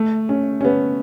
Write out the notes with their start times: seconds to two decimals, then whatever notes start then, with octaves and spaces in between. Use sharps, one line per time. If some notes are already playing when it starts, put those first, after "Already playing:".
Already playing: A3
0.29 C#4
0.61 C#4
0.65 B3